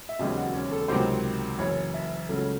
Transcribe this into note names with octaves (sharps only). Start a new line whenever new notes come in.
E5
E1 D#2 C#3 F#3 C4 D#5
F#4
C#4
A4
C#2 C3 D#3 F#3 C4 C5
F#1 F#2 E3 C#5
E5
C#2 C#3 F#3 A3